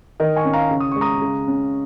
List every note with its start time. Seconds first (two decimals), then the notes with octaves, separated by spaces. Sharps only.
0.20 D#3 A#4 D#5
0.36 G#5 C#6
0.45 C#4
0.53 F5 A#5
0.71 C#3
0.80 D#6
0.91 G#3 C#6
1.01 A#5 D#6
1.22 C#3
1.48 C#4